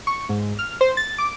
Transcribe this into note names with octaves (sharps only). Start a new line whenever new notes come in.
C#6
G#2
F6
C5
A6
D6